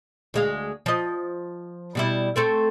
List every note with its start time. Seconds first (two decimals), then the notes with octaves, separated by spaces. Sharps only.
0.34 D2 G#3 F5
0.86 F3 D#5
1.95 B2 G3 E4
2.36 A3 C4 A4